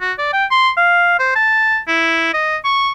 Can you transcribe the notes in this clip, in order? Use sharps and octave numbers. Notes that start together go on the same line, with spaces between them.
F#4
D5
G5
C6
F5
C5
A5
E4
D#5
C#6